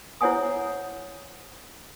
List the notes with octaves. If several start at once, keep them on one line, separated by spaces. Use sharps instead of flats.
E4 C5 C#5 F#5 G#5 D#6